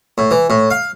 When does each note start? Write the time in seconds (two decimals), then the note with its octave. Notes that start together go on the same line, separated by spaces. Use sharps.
0.18 A2
0.31 E3
0.50 A2
0.70 F5